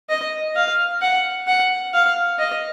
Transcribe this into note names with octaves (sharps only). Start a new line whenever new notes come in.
D#5
F5
F#5
F#5
F5
D#5